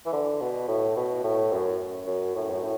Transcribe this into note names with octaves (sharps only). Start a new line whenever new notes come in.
E3
D3
B2
A2
B2
A2
F#2
F#2
A2
F#2
A2